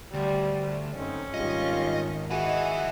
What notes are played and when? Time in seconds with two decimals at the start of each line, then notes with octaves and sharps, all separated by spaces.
0.14 D2 G3
0.96 F#2 C4 C#4 D#4 A4
1.34 G#1 D#3 G3 F4 D#5
2.31 E4 F#4 G#4 D#5 G#5